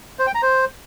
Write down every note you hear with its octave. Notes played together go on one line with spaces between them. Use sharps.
C5
G5
A#5
C5